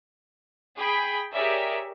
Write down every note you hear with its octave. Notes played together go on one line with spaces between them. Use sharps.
G#4 G5 B5 B6
G4 G#4 A#4 C#5 D5 E5